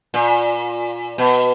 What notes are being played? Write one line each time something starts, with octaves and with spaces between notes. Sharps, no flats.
A#2
B2